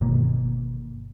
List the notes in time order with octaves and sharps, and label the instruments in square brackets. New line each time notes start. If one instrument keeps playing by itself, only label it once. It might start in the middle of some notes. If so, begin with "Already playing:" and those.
[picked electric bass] G1 B2 D#3 A#3